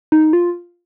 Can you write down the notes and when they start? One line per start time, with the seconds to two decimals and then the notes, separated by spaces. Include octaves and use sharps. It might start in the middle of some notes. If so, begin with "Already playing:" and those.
0.12 D#4
0.33 F4